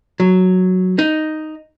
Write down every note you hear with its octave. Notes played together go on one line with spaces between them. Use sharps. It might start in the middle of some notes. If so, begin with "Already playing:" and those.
F#3
D#4